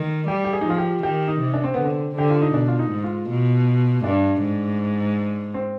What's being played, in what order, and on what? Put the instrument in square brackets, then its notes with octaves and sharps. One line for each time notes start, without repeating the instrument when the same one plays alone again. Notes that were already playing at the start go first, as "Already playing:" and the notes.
Already playing: [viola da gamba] D#3
[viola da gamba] G3 [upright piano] G4
[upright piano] G4
G#4
D#4
[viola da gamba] F3 [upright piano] F4
[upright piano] G4
[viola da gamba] D#3 [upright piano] G4
[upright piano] D#4
[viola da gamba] C3
[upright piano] D4
C4
[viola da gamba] D3 [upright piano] B3
[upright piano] C4
[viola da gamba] D3 [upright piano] G4
[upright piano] F4
D#4
[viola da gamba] B2 [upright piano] D4
[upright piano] F4
D#4
[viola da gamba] G#2
[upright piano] F4
[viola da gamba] B2
[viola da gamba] G2 [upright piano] D4
[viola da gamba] G#2
[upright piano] C4